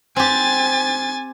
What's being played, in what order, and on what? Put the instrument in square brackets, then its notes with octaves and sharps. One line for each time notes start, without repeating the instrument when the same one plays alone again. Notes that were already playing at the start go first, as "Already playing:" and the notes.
[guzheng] C4 G4 [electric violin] G#5 A6